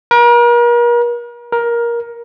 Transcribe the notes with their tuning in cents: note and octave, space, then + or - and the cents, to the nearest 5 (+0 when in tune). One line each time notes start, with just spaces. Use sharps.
A#4 +40
A#4 +15